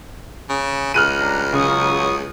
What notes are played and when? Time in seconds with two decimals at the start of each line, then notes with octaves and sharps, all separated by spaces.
0.49 C#3
0.94 C#2 F6 F#6 D#7
1.19 G3 D4 A#5
1.53 C#3 F#3 C#6 D#6